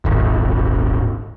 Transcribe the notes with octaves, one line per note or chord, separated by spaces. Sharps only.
D#1 G#1